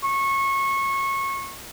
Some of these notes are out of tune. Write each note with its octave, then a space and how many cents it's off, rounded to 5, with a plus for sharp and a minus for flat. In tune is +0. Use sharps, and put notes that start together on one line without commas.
C#6 -25